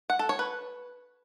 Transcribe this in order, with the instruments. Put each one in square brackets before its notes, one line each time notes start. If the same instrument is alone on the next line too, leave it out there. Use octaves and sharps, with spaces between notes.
[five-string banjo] F#5
A4
C#5
B4